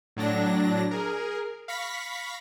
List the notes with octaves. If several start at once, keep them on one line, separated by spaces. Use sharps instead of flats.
A2 F#3 D4 A#6
G#4 A#4
F5 B5 C#6 A#6 B6